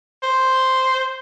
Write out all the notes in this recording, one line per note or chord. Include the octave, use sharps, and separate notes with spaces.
C5